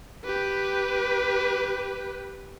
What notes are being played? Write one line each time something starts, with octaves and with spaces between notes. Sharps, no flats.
G4 B4